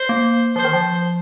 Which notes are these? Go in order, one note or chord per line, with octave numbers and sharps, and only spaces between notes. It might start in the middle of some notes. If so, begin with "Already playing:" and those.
Already playing: C5
A#3
F3 C5
D#3
F3